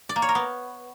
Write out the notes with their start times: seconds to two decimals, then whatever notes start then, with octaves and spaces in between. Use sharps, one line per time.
0.09 D5
0.16 A#3
0.22 C#5
0.29 A#4
0.35 B3